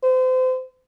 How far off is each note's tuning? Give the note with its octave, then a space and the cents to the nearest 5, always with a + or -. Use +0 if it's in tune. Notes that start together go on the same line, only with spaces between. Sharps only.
C5 -35